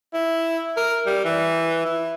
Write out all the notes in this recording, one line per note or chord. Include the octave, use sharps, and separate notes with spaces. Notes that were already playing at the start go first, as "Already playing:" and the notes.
E4
A#4
G3
E3
E4